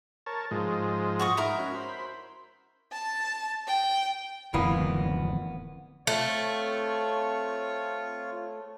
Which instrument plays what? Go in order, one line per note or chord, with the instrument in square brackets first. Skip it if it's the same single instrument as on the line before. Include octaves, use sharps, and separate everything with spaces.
[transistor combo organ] A#4 C#5 A5
G#2 F3 G#3
[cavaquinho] F#4 C#6 D#6
[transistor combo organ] D#4 [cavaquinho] E4 A#4
[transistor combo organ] C#4 F#4
C5 B5
[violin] A5
G5
[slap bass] D1 F2 D#3 [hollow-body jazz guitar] E3 A#3 B3
[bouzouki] A3 [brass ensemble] C4 C#5 [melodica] F4